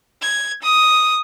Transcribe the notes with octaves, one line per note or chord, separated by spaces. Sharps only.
G#6
D#6